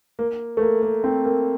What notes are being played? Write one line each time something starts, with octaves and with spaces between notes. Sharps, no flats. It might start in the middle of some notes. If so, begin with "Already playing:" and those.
A#3
A3
A#3
A#3
C4
A#3